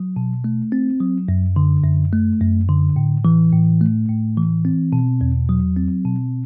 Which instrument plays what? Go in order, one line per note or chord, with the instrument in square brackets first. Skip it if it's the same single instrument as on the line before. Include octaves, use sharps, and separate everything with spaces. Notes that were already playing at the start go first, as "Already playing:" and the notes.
Already playing: [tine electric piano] F#3
B2
A3
C4
F#3
F#2
D3
F#2
A3
F#2
D3
A2
E3
A2
A3
A2
E3
C4
B2
E2
F#3
C4
B2